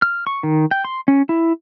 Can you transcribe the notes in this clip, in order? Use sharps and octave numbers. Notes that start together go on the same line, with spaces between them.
F6
C#6
D#3
G5
C6
C#4
E4